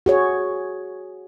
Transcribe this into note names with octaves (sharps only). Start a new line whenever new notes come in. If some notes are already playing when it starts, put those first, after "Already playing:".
F#4 G#4 C#5